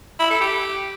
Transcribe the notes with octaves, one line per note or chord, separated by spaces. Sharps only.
E4
A4
G4